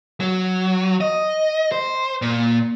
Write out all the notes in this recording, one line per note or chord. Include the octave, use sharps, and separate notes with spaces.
F#3
D#5
C5
A#2